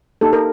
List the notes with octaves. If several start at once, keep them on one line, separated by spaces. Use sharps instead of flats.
A#3 D#4 G4 A4
A#4